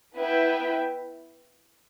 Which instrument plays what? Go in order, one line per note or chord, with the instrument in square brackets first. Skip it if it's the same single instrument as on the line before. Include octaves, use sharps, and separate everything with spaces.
[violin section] B3 E4 B4 E5 G5